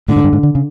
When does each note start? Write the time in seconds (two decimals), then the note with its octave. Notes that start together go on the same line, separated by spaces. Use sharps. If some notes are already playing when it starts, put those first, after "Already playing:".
0.08 A2 D3
0.16 G#2
0.24 G2
0.33 G#2
0.43 D3
0.55 C#3